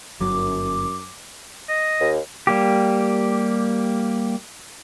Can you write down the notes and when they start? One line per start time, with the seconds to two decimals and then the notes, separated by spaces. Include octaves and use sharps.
0.20 G1 F#2 F#3 D6
1.69 D#5
2.01 D#2
2.47 G3 A#3 G4